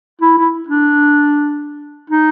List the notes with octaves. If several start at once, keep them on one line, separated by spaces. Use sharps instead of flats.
E4
E4
D4
D#4